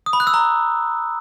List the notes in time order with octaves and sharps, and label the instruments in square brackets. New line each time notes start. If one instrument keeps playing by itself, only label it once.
[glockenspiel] D#6
B5
F#6
E6
A#5